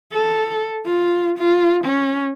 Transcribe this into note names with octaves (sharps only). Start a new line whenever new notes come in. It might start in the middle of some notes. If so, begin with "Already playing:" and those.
A4
F4
F4
C#4